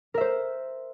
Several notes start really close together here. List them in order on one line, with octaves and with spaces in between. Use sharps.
A#4 E5 C5